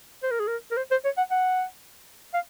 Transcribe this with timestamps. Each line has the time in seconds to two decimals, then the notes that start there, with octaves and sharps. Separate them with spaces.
0.23 C5
0.31 A#4
0.40 G#4
0.48 A#4
0.71 A#4
0.77 C5
0.91 C5
1.05 C#5
1.17 F#5
1.31 F#5
2.34 F5